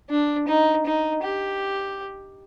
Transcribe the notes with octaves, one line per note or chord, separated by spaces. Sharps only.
D4
D#4
D#4
G4